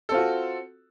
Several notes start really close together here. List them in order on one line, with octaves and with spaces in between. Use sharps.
A4 C4 F4 F#4